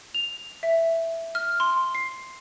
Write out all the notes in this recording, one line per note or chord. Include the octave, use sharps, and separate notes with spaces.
F7
E5
F6
C6
C7